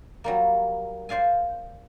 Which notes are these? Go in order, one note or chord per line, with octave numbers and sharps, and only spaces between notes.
F#3 G3 A#3
C5 D5 F5 G#5